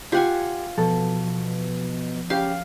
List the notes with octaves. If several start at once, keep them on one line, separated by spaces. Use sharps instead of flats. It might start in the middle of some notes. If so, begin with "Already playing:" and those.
F4 G4 F#5 G#5
B2 F3 A4
C#3 G4 F5